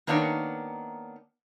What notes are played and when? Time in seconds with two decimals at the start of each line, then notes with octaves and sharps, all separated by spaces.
0.07 D#3 A#3 B3 D4 D#4 C#5